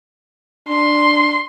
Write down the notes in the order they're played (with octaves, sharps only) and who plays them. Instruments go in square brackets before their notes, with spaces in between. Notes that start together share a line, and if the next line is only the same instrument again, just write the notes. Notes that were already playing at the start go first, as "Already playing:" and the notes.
[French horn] D4 [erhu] C6